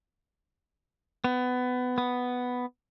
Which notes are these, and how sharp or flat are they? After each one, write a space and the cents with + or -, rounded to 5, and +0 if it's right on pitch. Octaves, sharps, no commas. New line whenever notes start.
B3 +20
B3 +5